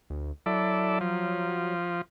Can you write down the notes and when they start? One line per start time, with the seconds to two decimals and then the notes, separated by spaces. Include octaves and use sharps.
0.10 D2
0.46 F#3 E4 A4 D5
1.01 F3